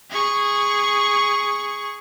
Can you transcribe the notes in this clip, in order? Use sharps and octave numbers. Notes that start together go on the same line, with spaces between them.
G#4 C#6